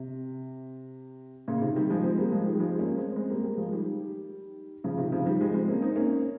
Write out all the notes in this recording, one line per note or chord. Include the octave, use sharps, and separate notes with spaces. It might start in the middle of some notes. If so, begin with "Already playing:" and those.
Already playing: C3
A#2 C#3
C3 D#3
D#3 G3
F3 G#3
G#3 C4
G3 A#3
F3 G#3
D#3 G3
G3
F3 G#3
A#3 C#4
G#3 C4
G#3 C4
G3 A#3
G3 A#3
F3 G#3
D#3 G3
C#3 F3
C3 D#3
C#3 F3
D#3 G3
F3 G#3
G#3 C4
A#3 C#4
C4 D#4
A#3 C#4